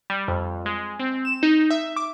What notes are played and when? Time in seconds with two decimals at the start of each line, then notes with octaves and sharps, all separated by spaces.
0.10 G3
0.28 F2
0.66 G#3
0.99 C4
1.25 E7
1.43 D#4
1.70 E5
1.96 D6